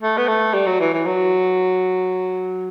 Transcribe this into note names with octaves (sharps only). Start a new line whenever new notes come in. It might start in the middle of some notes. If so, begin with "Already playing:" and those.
A3
B3
A3
G3
F#3
E3
E3
F#3